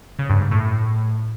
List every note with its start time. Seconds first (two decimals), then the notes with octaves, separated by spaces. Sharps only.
0.19 C#3
0.30 G2
0.41 G#2
0.51 A2